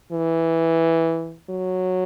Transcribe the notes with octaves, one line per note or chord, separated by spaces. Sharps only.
E3
F#3